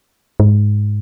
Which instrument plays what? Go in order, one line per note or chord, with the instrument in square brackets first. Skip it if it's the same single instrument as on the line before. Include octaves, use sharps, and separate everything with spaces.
[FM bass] G#2